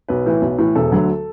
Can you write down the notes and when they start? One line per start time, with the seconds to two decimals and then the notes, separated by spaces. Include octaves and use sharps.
0.08 B1 B4
0.26 A2 E3
0.42 B1
0.58 A2 E3
0.75 E1 A4
0.92 D2 D3 F#3